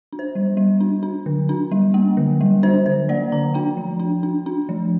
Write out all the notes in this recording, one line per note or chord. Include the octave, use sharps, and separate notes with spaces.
D4
C5
G3
G3
D4
D4
D3
D4
G3
A#3
D3
G3
D4 C5
D3 C5
A#3 D5
D3 A#5
D4 G5
F3
D4
D4
D4
F3